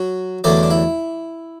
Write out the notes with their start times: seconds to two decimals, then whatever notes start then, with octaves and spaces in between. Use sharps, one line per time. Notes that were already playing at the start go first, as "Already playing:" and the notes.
Already playing: F#3 F#4
0.44 E2 D3 F#3 A3 D4 D5
0.63 D4
0.71 E4